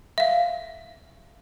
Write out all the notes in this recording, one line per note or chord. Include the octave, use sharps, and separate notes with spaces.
E5 F5